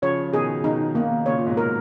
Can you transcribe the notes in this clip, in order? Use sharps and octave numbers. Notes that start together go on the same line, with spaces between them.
C#3 F3 C#5
B2 D#3 G#4
B2 D#3 D#4
B2 D#3 A#3
A#2 C#3 C#5
A#2
G#2 B2
A#4